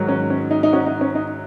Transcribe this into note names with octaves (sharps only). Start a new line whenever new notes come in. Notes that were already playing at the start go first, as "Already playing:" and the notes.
Already playing: G#2 D#3 F#3
C#4
C#4
D#4
D#4
C#4 F#4
D#4
C#4
D#4